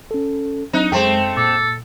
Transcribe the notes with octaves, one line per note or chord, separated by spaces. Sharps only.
C#4 A4
F#3 C4 D4 D#4 F#6
F#2 G#3 A3 C4 G5 C6
A#2 A4 D6